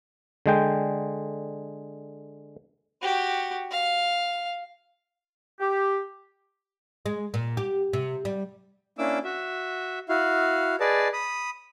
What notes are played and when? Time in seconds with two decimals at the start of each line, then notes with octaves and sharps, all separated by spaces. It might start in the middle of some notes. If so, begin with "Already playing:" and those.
0.46 D3 G#3 G5
3.02 F#4 G4
3.71 F5
5.60 G4
7.06 G#3
7.34 A#2
7.57 G4
7.93 C3
8.25 G3
8.98 A#3 C#4 D4 E4 D6 E6
9.24 F#4 E5
10.09 E4 F#4 F5
10.80 G#4 B4 D5 D#5 A5
11.13 B5 D#6